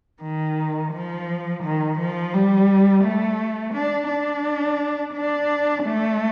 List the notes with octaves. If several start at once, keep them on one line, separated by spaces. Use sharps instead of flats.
D#3
F3
D#3
F3
G3
A3
D4
D4
D4
A3